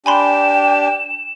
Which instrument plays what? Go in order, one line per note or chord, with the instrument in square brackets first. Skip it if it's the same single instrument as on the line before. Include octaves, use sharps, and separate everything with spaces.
[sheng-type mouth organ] D4 G4 [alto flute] G5 [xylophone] G#5 B5 C6 [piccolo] E7